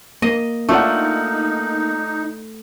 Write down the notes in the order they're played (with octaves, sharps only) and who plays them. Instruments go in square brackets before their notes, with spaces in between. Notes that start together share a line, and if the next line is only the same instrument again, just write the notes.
[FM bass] A#3 [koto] D#5
[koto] A3 [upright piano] D4 F4 F#5 [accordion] D#4